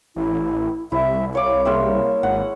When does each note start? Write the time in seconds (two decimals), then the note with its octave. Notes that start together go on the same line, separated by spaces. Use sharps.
0.16 A1 E4
0.92 C2 E4 E5
1.35 C#5 F5 D6
1.65 G#3 A#3 C#4 E5
2.23 G#1 F#5